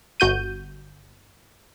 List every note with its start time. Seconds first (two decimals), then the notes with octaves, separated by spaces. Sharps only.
0.20 G1 F#4 G6 D#7